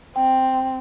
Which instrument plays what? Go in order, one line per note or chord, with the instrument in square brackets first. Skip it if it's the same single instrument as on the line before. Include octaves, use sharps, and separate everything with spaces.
[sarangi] C4 [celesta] G5